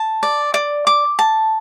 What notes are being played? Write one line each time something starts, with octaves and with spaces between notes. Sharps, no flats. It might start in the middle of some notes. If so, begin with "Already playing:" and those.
Already playing: A5
D5
D5
D6
A5